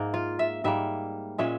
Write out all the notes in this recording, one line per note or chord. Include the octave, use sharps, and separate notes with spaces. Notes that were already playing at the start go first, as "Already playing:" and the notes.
Already playing: G#2 A#3
F4
E5
G#2 G3 A#3 E5
A#2 G#3 C#4 E5